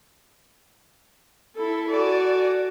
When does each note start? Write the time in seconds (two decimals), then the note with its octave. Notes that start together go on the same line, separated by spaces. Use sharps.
1.56 E4 A4
1.89 F#4 A4 D5 G#5